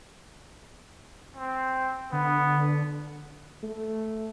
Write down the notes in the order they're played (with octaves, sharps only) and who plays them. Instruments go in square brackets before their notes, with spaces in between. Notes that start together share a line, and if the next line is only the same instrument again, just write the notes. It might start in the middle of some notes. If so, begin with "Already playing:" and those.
[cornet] C4
[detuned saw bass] D3 [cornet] B3
[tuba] A3